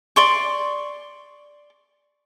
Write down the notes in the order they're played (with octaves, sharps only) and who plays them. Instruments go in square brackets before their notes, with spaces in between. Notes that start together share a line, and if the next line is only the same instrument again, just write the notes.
[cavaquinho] D5 C6 C#6